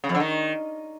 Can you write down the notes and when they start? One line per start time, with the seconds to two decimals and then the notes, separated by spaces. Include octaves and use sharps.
0.04 C#3
0.09 F2
0.15 D3
0.20 D#3